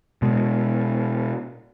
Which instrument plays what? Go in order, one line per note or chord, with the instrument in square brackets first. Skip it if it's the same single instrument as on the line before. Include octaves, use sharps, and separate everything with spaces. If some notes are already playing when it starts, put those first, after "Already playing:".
[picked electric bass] B2 G#3